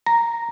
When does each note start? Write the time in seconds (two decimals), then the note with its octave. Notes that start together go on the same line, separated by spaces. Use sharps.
0.06 A#5